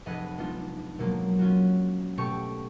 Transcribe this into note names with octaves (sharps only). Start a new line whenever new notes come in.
F1 G#4 B4 D#5 F#5 B5
G#3 B3 D4 D#4 F4
B2 F3 F#3 G#3 A#3
C#4 F4 F#4
B2 A3 G4 C#6